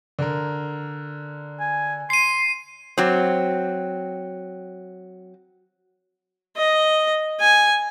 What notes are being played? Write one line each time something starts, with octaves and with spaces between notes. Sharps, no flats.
D3 A#4
G#5
C6 C7 D#7
F#3 C4
D#5
G#5